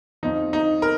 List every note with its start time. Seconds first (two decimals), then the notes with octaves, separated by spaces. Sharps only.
0.23 F2 F3 D#4
0.53 D#4
0.82 A#4